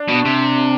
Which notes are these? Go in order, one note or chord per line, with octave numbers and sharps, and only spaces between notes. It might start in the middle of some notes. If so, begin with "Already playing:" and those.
Already playing: D4
B2
C3